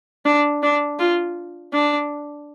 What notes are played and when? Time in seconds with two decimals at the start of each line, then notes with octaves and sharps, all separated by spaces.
0.26 D4
0.63 D4
0.99 F4
1.73 D4